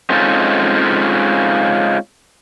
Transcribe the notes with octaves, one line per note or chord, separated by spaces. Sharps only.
G#3 C4 C#4 D#4 F4 A4